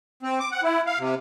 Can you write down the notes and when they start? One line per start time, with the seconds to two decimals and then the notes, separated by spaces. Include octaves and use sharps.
0.23 C4
0.40 D6
0.51 F#5
0.63 E4
0.86 F5
0.99 C3